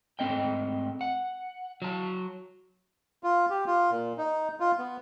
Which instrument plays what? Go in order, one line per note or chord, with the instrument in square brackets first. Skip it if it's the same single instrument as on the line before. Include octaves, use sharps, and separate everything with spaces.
[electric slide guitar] G#2 A3 C4 D#5 G5
F#5
F#3 A5
[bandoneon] F4
G4
F4
A#2
D#4
F4
B3